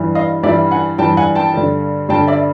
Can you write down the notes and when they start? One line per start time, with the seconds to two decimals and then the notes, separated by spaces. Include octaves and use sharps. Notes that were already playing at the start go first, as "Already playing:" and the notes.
Already playing: G2 E3 G3
0.15 D#5 F5
0.43 G2 E3 G3 D5 E5
0.71 F#5 G#5
0.98 G2 E3 G3 G5 A5
1.17 F#5 G#5
1.35 G5 A5
1.54 G2 D3 G3
2.09 G2 D3 G3 G5 A5
2.27 D5 E5